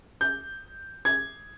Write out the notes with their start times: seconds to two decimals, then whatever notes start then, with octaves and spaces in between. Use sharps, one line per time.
0.21 G6
1.05 G#6